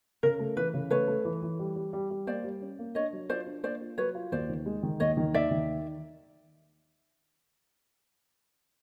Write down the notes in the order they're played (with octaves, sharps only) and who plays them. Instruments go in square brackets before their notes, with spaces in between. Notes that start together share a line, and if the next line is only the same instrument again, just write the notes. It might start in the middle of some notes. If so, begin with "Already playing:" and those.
[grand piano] C#3 [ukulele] A#4
[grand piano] A3
[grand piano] E3 [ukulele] B4
[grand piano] C#3
[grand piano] A3 [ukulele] B4 C#5
[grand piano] A3
E3
E3
G3
G3
G3
G3
[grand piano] A#3 [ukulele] C5 D5
[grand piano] G3
C#4
A#3
[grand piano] D4 [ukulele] C#5 D#5
[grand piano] F#3
[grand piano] F4 [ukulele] C5 D5
[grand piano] D4
[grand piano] A#3 [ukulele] C5 D5
[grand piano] F4
[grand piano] F#3 [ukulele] B4 C#5
[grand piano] F4
[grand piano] D#2 [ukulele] C5 D5
[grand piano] D#3
G#3
D#3
[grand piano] D#2 [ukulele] C#5 D#5
[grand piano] D#3
[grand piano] D#2 [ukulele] D5 E5
[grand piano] D#3